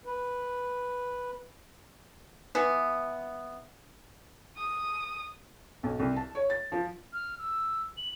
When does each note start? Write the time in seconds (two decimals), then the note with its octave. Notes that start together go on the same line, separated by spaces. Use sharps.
0.06 B4
2.55 E3 B3
4.58 D#6
5.83 B1
5.99 C2
6.16 A5
6.35 C#5
6.50 A6
6.72 F3
7.13 F6
7.39 E6
7.97 F#7